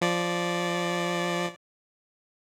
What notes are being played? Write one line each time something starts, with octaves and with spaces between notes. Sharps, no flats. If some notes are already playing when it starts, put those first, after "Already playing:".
F3 D5